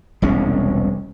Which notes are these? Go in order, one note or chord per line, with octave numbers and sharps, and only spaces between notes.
E1 C2 G#3 C#4